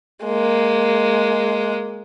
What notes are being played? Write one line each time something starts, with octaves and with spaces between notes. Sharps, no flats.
G#3 A#3